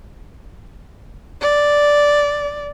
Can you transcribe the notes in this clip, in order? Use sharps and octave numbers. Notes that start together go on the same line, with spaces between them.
D5